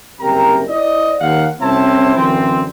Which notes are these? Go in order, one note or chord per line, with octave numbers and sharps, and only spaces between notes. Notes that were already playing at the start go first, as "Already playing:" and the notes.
F#1 C2 C3 A#4 G5 A#5
E4 C5 D5 D#5
D#2 F5 F#5
C2 C4 C#4 E4 C5 A5
F#2 D3 E3 C4